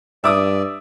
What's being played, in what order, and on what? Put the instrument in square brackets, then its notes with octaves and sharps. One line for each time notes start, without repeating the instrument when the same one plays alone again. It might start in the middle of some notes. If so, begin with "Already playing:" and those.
[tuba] G2 [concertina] D5 [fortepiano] E5 D6 D#6